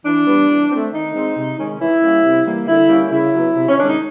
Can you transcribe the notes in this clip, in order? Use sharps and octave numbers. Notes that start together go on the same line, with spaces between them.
E3 D4
G3 B3
E3
A3 C4
D#3 D#4
G#3 C4
C3
D#3 G#3 C#4
E3 E4
G3 A#3 C#4
C3
E3 G3 A#3
D3 E4
G3 A#3 C#4
C#3 E4
F#3 B3
C3
C#4
D#3 G#3 D4
D#4